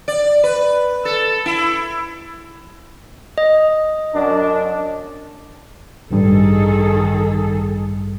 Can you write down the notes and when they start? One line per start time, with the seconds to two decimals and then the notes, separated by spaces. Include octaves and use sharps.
0.08 D5
0.44 B4
1.05 A4
1.46 E4
3.38 D#5
4.14 F#2 D4
6.11 A1 G2 D#3 G3 G#4 A4